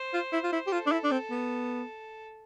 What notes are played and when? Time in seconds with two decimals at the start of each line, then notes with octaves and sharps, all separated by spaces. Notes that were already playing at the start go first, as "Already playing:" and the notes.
Already playing: C5
0.14 F4
0.33 E4
0.44 F4
0.53 E4
0.67 G4
0.72 F4 A4
0.87 D4
0.92 E4
1.04 D4
1.11 C4
1.30 B3